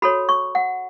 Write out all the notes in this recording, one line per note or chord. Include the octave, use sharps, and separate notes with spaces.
F#4 A4 C#5 B5
C#6
F#5